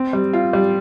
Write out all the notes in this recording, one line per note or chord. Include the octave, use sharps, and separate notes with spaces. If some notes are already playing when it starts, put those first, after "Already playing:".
Already playing: C4
G3
F4
G3